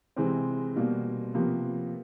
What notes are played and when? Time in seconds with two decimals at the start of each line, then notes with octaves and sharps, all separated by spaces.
0.16 C3 E3 G#3 C4
0.76 B2 G3 A#3
1.34 C3 F3 A#3 B3